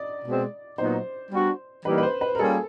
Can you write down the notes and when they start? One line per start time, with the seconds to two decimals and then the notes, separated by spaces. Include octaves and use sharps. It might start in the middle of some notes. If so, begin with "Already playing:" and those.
Already playing: D5 D#5
0.25 B2 G#3 C4
0.78 A#2 F#3 B3 D#4 C5
1.32 G3 B3 D4 F#4
1.85 E3 G3 A#3 D#4 G4 B4
1.98 B4
2.03 C5
2.21 B4
2.35 A#4
2.39 G3 A#3 C#4 F4 G#4 A4